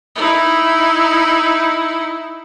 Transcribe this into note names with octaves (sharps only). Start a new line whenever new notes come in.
D#4 E4